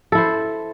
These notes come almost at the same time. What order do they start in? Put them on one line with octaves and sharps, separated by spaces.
A4 E4 C5